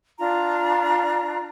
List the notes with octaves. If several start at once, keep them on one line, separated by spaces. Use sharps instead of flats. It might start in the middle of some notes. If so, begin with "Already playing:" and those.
D4 F4 A#5